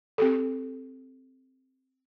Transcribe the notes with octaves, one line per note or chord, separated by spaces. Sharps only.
C4 G4 A4